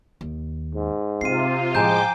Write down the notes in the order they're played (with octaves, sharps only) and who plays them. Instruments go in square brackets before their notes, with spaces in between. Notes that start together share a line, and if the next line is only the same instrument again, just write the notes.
[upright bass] D#2
[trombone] G#2
[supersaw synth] C3 F4 [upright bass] C4 [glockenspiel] C7 D#7
[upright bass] A2 [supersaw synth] F3 G5 D6 [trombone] G#3 [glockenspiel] G#5 A#5 G6